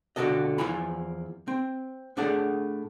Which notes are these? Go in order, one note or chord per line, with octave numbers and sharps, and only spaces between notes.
C#2 B2 D3 F#4 A4 D#5
E2 F3 E4 G#5 B5
C4
A2 D4 G#4 A4 F#5 A5